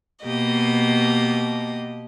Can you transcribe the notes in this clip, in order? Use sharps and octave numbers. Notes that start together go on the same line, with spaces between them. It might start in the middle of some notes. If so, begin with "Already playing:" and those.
B2 A#3 G4 D#5